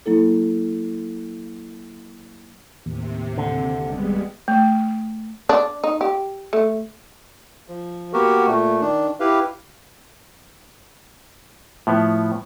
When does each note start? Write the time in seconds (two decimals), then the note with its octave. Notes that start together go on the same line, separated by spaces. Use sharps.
0.06 F#3 A#3 E4 A4
2.86 D#2 A2 C3
3.38 D3
3.84 F#1 G3 G#3 B3
4.48 A3
5.49 D4
5.84 D#4
6.01 G4
6.53 A3
7.68 F3
8.13 A#3 B3 F#4 G4 A#4
8.47 A#2 A3
8.81 D#3 D4
9.20 E4 G4 B4 F5
11.87 A2 F3 B3